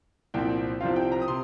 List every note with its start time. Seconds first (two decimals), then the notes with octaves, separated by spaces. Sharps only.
0.34 C2 A#2 F3 C4 G5
0.80 C2 C3 F3 C4 F4 F5
0.96 G5
1.12 A#5
1.22 D#6
1.28 C3 C6